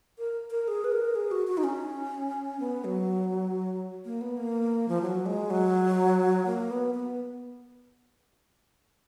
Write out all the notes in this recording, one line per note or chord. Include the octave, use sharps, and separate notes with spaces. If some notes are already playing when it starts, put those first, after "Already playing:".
A#4
A#4
G#4
B4
A#4
G#4
F#4
F#4
D#4
C#4
B3
F#3
A#3
B3
A#3
F3
F#3
G#3
F#3
A#3
B3
B3